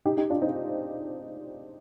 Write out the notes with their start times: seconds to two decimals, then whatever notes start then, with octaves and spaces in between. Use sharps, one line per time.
0.05 D#4 G4
0.17 D#4 G4
0.30 D4 F4
0.42 C4 D#4